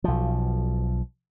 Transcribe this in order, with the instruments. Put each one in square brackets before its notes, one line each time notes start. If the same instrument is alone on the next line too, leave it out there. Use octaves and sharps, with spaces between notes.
[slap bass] B1 F3